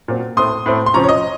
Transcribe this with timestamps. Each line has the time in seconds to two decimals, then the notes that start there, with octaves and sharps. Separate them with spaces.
0.08 A#2 F#3 C4
0.37 A2 A3 C4 C6 D#6
0.66 A2 A3 C4
0.86 C6
0.94 C#3 F3 C4 A#5 C#6
1.04 C#5
1.09 D#5